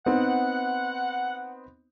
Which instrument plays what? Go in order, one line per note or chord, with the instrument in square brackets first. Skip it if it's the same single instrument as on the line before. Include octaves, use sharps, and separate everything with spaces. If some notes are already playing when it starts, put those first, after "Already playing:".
[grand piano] B3 C4 D#4 [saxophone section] F#5